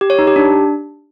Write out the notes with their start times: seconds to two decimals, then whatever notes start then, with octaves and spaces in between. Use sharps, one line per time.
0.01 G4
0.10 C#5
0.19 D#4
0.27 G4
0.36 D4